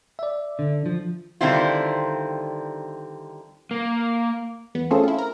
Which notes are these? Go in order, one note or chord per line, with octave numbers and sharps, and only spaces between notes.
D5 E5
D3
F3
D3 D#3 G3 C4 E4 F4
A#3
E2 B3
A3 C4 C#4 F4 G#4 A4
E4 F4
A#4